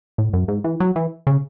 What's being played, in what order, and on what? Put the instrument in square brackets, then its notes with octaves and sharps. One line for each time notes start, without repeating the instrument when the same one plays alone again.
[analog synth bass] A2
F#2
G#2
E3
F#3
E3
C#3